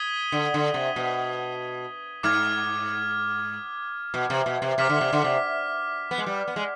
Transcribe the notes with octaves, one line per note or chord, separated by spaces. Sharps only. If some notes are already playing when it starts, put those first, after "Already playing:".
Already playing: D#6 G#6 B6 D#7 G7
D3
D3
C3
B2
G#2 D6 F6 G#6
B2
C3
B2
C3
C3 D6 F6 B6
D3
C3
D3
C3
B3
G#3
G3
B3
G#3